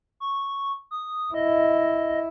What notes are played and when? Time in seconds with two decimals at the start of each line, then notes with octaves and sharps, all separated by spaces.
0.20 C#6
0.91 D#6
1.34 E4 D#5